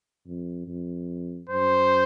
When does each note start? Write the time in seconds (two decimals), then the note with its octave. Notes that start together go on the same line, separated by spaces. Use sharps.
0.26 F2
0.68 F2
1.49 F#2 C5